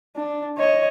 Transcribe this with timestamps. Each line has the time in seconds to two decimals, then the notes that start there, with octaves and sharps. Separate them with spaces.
0.16 D4
0.58 C#5 D#5